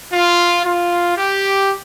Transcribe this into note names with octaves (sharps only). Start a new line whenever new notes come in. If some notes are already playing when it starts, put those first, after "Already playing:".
F4
F4
G4